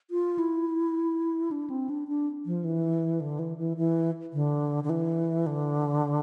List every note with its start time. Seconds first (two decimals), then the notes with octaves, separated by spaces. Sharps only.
0.11 F4
0.39 E4
1.51 D4
1.70 C4
1.90 D4
2.08 D4
2.46 F3
2.64 E3
3.20 D3
3.39 E3
3.58 E3
3.77 E3
4.33 D3
4.84 D3
4.90 E3
5.46 D3